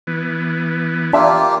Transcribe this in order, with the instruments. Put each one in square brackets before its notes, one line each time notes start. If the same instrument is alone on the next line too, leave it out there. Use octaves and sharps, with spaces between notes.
[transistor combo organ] E3 B3
[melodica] A#3 F4 G4 [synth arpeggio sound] D4 E5